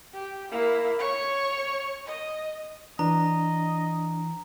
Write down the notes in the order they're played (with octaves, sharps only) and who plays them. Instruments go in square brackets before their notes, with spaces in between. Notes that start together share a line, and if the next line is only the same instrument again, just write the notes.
[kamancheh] G4
A#3 E4
C#5 C#6
D#5
[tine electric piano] E3 [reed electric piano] D4 [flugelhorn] D#5 [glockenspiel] A#5